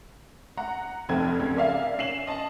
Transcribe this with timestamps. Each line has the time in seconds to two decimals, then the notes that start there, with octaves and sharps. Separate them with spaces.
0.57 F#5 A#5
1.09 F1 F2 C4 G#6
1.40 C#2
1.57 A#4 D5 E5 F5
1.98 C#4 C7 E7 F#7
2.27 D#5 A5